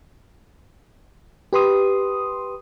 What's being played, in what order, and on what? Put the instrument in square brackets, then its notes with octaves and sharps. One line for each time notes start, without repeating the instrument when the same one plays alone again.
[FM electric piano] G4 B4 C6 D#6